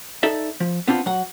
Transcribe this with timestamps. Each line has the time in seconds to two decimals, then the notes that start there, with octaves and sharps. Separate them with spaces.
0.23 D#4 A4 D5 E5
0.60 F3
0.88 B3 C4 D4 F4
1.06 F#3 F#5